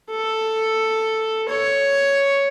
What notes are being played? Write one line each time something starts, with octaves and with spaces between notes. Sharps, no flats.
A4
C#5